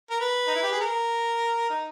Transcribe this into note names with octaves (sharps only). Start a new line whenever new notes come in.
A#4
B4
D#4
E4
G4
G#4
A#4
D#4